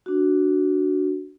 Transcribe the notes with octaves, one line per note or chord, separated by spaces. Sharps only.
D4 F#4